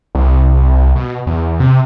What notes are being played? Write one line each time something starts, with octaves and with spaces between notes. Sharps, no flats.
C2
B2
E2
C3